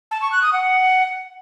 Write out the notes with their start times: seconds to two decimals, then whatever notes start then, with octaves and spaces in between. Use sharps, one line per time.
0.11 A5
0.22 C#6
0.32 F#6
0.42 D#6
0.53 F#5